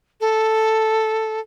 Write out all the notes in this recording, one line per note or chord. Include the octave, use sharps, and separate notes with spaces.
A4